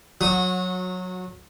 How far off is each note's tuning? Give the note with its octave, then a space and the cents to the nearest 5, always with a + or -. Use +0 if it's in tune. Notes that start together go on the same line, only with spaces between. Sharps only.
F#3 -15 F#4 -30 D#6 +0